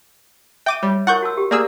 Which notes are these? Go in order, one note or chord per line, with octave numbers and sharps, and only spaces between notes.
E5 G5 D6 D#7
G3 C#5
E4 A#4 F#5 C#6 G6
F#4 A5 E6
G4
A#3 G#4 D5 E6